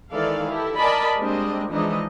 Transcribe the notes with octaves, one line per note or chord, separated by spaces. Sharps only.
D#3 E3 G#3 A4 D5 F5
E4 G4 A4
A#4 D5 D#5 G#5 A5 B5
G3 G#3 A#3 C4 D4 D#5
E3 F3 G#3 D4 D#4 D#5